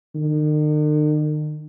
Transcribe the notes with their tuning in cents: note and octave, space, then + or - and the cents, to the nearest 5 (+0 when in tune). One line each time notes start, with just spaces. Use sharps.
D#3 -45